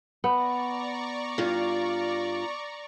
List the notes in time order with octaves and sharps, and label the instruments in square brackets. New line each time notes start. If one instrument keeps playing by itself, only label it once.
[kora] B3 [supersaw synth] D5 A#5 C#6
[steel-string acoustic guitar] G2 F4